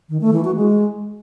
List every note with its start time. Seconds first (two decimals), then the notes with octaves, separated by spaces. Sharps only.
0.09 D#3
0.21 A3
0.33 E3
0.45 F#4
0.56 G#3